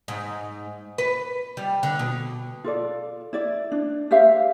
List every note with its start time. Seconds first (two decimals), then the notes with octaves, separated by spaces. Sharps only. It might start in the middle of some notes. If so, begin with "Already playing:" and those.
0.08 G#2
0.98 B4
1.57 G3
1.83 D3
1.99 B2
2.64 F4 A4 D5
3.33 E4 D5
3.72 D4
4.11 G4 C5 E5 F5